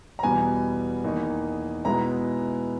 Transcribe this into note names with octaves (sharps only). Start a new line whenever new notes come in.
A#5
E2 B2 G3 B3 G#5
E2 D#3 A#3 D#4
B2 G#3 B3 E4 A#5